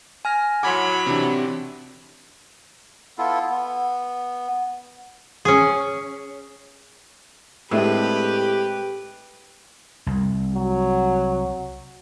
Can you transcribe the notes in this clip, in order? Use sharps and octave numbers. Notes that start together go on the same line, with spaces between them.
G#5 F6 A#6
A2 F#3 F#5 B5 C6 D6 G#6 B6
C3 E3 D4
B3 E4 F4 A4
B3
C#4 G#4
A2 G#3 C4 D4 G4 B4
C2
F#3